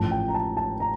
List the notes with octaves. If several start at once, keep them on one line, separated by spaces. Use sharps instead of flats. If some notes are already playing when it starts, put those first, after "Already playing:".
Already playing: A1 A2 F3 A5
G5
A#5
A5
A5
A#5